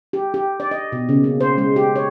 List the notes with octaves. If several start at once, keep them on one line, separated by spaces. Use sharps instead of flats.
G4
G4
D5
D#5
B2
C#3
A#3
C5
G#3
G4
C#5